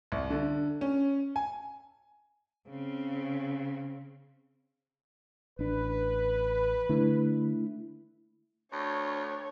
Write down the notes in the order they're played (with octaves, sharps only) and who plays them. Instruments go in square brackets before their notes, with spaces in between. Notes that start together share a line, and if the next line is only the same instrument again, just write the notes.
[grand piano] C2
D3
C#4
G#5
[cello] C#3 C4
[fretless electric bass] A1 D4 [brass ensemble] B4
[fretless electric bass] D3 [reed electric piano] A3 D4 E4
[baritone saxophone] D2 [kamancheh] C#5